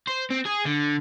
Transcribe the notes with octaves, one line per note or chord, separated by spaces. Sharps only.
C5
C4
G#4
D3